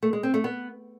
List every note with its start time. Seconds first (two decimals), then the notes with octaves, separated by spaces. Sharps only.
0.03 A3
0.13 G#3
0.23 C4
0.34 A3
0.44 B3